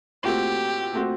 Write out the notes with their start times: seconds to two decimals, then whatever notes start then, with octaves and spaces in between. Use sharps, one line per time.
0.23 A#2 A3 C4 F#4 G4
0.93 A#2 A3 C4 F#4